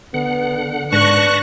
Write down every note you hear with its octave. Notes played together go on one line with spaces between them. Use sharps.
D3 B3 F#5
G#2 D4 B4 A5 C#6 F#6 A#6 C#7